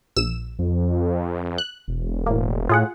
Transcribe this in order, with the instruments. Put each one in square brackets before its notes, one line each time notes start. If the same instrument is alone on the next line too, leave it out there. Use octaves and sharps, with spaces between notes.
[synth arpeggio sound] A#1 E6 E7
[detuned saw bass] F2
[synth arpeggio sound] F#6
[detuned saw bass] E1
[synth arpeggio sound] A2 A#3
[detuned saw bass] A2 [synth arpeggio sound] F4 G#4 F#5